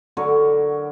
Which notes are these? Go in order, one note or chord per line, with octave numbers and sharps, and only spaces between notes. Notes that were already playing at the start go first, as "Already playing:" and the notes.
D3 F#3 A#4 C#5